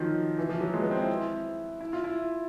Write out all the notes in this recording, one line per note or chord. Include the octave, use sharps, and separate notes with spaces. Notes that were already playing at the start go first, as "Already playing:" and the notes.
Already playing: D#3 F3 F#3
E3
F3
F#3
G#3
B3
C4
E4
E4
F4
E4